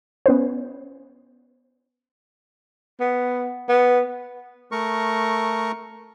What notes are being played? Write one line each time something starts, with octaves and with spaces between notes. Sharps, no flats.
B3 C#4 B4 C5
B3
B3
A3 A#4 C#6